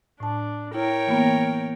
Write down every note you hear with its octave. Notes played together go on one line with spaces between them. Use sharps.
A2 D4 A5
E4 A#4 C#5 G5
E3 A#3 B3